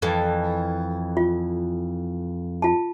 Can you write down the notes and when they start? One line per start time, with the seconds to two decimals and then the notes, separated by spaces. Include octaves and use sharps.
0.02 F2 E3 A4
1.17 F4
2.62 F4 A5